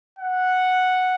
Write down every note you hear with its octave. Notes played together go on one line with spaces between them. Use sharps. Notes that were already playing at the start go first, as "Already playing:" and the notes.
F#5